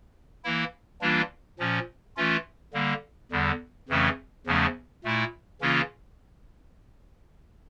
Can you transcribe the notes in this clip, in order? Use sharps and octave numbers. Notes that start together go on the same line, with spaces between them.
E3 A#3 E4
E3 G3 A#3 D4 F4
A#2 F3 C#4
E3 A3 C#4 F4
D3 G3 A#3
E2 D3 G3
F2 C#3 E3 A3 C#4
E2 C#3 F3 A3 C#4
A#2 A3 E4
C#3 E3 A#3 C#4 F4